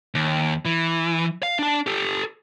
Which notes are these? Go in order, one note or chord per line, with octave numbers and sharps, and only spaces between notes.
D#2
E3
F5
D4 A5
G4 A4